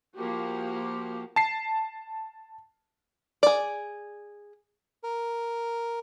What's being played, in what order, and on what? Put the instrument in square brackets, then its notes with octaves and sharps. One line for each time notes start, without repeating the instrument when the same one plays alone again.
[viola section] F3 A#3 F#4 G4
[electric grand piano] A5 C7
[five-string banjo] G#4 D5
[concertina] A#4